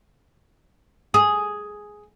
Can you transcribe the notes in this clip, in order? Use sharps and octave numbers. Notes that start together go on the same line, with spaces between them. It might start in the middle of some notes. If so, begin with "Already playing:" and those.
G#4